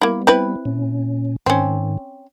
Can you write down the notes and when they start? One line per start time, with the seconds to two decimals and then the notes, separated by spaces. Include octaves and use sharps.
0.01 G3 A#3 B3 E4
0.27 C4 E4 B4
0.65 A#2 C#4
1.46 G#2 D#3 C4 C#4